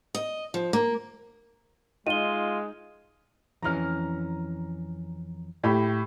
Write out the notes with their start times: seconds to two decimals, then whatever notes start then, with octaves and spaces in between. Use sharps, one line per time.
0.15 D#5
0.54 F3
0.73 A#3
2.07 G#3 D#4 F4 D#7 G7
3.62 F2 E3 C#4 A#5 F6
5.63 A2 G4 B5